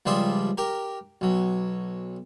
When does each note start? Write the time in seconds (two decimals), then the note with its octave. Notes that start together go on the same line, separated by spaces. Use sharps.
0.06 C#2 F3 G3 C5 E5 D#6
0.58 G4 A#4
1.21 B1 F#3